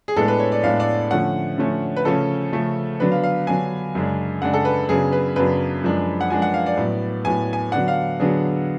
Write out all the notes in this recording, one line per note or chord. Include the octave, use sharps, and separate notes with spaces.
G#4
A2 G#3 B3 D4 A4
B4
C#5
D5
A2 G#3 B3 D4 F5
D5
D3 F3 A3 C#4 F#5
D3 F3 A3 C#4
B4
C#3 F3 A3 C#4 A4
C#3 F3 A3 C#4
D3 F#3 B3 D4 B4
F5
F5
D3 F#3 B3 D4 G#5
F#2 C#3 G#3 D4
F#2 C#3 G#3 D4 F#5
A4
B4
F#2 C#3 F#3 B3 D4 G#4
B4
F#2 C#3 F#3 B3 D4 B4
F#2 F3 G#3 D4
F#5
F#2 F3 G#3 D4 G#5
F#5
F5
D5
A2 F#3 B3
A2 F#3 B3 G#5
G#5
D3 F#3 B3 D4 F#5
F5
D3 F#3 B3 D4 G#4